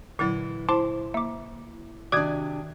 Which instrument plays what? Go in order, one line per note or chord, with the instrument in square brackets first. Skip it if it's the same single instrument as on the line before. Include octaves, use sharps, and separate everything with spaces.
[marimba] A#2 D3 F#3 [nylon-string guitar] E3 E4
[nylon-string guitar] E4 [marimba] C5 [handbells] A5 C6 D6
[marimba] A#3 [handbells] E5 D6
[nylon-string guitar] C3 D4 [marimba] D#3 F#4 D5 [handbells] D6 D#6 G#6